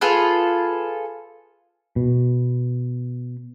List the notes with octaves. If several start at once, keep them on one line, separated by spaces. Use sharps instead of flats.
F4 G#4 A4 B4
B2